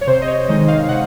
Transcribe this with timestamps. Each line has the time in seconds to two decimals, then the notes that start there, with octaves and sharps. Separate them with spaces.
0.01 C#5
0.07 C3 C5
0.22 D#5
0.28 C#5
0.49 D#3 G#3 D#4 D#5
0.68 F5
0.88 C3 F#5